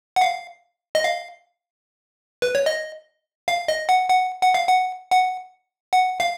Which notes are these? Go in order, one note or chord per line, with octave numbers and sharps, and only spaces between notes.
F#5
F5
D#5
F5
B4
C#5
D#5
F5
D#5
F#5
F#5
F#5
F5
F#5
F#5
F#5
F5